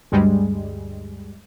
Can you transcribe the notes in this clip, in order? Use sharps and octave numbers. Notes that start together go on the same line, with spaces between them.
D2 G2 G3 G#3